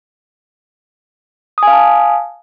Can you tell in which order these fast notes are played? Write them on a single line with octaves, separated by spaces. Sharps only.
D#6 G#5 F5 A5